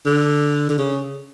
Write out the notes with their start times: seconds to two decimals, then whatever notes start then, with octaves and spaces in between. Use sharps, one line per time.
0.06 D3
0.69 D3
0.78 C#3